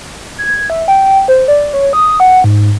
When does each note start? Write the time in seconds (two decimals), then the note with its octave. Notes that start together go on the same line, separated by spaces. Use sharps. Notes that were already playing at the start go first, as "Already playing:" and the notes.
0.38 G#6
0.70 E5
0.88 G5
1.28 C5
1.48 D5
1.74 C#5
1.93 D#6
2.07 D#6
2.20 F#5
2.44 G#2